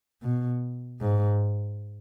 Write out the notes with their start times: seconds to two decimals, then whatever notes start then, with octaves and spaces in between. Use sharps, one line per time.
0.22 B2
1.01 G#2